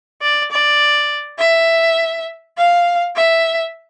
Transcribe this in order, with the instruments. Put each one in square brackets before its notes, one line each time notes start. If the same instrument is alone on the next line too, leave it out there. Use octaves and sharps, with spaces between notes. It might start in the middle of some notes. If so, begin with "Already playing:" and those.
[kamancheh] D5
D5
E5
F5
E5